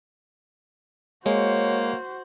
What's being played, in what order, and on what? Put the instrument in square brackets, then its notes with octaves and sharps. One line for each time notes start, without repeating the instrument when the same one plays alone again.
[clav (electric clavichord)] G#3 [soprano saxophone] A#3 [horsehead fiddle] F#4 C5 [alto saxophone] C#5